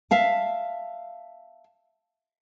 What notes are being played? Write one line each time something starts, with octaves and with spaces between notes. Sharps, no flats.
E5 F5 A5